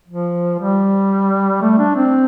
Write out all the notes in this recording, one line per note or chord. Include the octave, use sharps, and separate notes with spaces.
F3
G3
A3
D4
C4